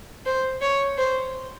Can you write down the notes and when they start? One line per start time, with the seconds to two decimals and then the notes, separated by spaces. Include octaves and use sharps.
0.26 C5
0.62 C#5
0.98 C5